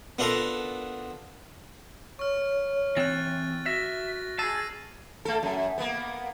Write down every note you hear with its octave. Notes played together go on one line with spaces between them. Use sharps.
B3 D4 F4 A4 A#4
C#5 C#6 F6
E3 C4 F#6 A6
F#4 E5 A#6
G#4 A5 E6 C7 D#7
A3 A4
F#2
A#3 B3